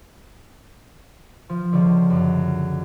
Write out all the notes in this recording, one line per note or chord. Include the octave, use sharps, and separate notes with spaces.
F3
C#2 D3
F#2